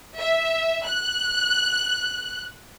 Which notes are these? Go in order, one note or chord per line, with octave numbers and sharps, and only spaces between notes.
E5
F#6